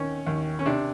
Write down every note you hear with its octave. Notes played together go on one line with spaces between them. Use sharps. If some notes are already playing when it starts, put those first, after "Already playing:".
Already playing: D#2 D#3 C#4
D#2
C#4
C3 D4